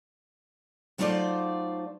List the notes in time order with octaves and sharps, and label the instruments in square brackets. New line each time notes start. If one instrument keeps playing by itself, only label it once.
[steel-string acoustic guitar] F#3 A3 D#4 F4 C5 D5